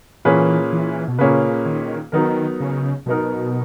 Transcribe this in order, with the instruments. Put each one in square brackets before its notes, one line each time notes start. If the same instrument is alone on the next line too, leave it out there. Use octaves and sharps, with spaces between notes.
[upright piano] A#2 A#3 C#4 G#4 B4 [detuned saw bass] E3
[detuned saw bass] E3
B2
[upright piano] A#2 A#3 C#4 G#4 B4 [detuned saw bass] C#3
[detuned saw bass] D#3
[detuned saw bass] D#3 [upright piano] F#3 B3 D#4 A#4
[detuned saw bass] C#3
[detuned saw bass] B2 [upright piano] F#3 B3 D#4 A#4